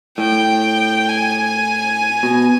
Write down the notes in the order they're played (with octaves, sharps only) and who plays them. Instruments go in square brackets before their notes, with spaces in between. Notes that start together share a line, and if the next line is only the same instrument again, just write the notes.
[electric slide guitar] A2 [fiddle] G5
[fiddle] G#5
[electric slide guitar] B2